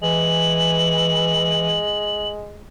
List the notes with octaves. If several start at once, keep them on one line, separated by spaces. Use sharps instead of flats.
E3 G#3 F#7